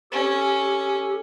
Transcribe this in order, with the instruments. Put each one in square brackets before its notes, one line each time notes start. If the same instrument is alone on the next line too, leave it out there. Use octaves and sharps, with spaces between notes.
[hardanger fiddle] C#4 [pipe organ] G4 A4